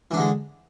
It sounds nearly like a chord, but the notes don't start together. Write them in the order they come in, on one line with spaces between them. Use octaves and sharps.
E3 D4 D3 G#3